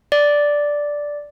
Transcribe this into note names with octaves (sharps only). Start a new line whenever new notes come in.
D5